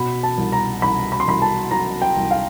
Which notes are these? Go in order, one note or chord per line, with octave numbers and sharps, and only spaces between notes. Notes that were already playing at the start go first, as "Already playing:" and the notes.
Already playing: B2 B5
A5
C2
A#5
C2 B5
B5
C6
C2 B5
A5
F#3 A#5
G5
C2
F5